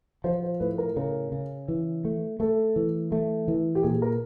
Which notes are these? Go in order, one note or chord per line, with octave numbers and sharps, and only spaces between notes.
F3 C5
C5
A2 B4
A#4
C#3 A#4
C#3
E3
A3
A3 A4
E3
A3
E3
G4
A#2 G#4
A#4